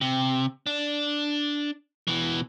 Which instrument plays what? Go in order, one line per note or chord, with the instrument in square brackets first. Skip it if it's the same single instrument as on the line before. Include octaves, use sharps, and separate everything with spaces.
[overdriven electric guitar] C3
D4
B2 E3